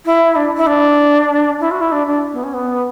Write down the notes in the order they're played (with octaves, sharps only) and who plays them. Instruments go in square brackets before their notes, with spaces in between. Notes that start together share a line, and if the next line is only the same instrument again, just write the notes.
[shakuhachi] E4
D4
E4
D4
E4
F#4
E4
D4
D4
B3
C#4
B3